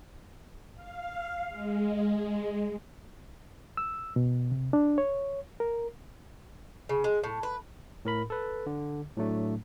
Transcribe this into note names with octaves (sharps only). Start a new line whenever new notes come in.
F5
G#3
E6
B2
C3
D4
C#5
A#4
C#3
G#3
A2
B4
A2 A#4 B5
A4 B4
D3
A2 F#3 A3 D4